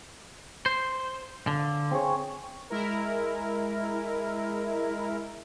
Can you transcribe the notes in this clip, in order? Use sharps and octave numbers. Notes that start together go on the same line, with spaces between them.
C5
D3 F5
C4 G#4 C#5
G#3 E4 A#4